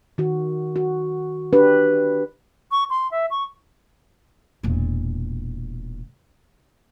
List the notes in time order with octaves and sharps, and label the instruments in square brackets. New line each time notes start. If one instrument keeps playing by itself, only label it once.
[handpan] D#3 F#4
F#4
D4 G4 B4
[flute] C#6
C6
E5
C#6
[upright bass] E1 A#2